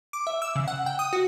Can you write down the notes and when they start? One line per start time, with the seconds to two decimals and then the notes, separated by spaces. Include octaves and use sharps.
0.13 D6
0.27 E5
0.42 E6
0.55 C#3
0.68 F#5
0.86 G5
0.99 D#6
1.13 F#4